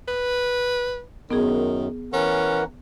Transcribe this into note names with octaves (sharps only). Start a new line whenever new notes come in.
B4
F#2 D#3 B3 G#4
E3 C#4 A#4 F#5